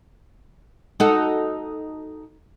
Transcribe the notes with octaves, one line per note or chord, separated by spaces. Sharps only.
D#4 F#4 A4